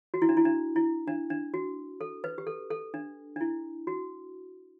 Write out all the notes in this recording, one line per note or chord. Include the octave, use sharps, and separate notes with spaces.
F#4
E4
D4
E4
D4
E4
D4
D4
F#4
A4
B4
G4
A4
A4
D4
D4
E4
F#4